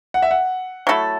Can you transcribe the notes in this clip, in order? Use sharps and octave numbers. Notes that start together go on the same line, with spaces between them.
F#5
E5
F#5
F#3 A3 E4 A4